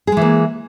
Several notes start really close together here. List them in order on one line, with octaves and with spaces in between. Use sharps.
G#4 G#3 E3 A#3